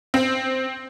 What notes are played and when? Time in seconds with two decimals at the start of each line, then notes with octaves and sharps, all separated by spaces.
0.14 C4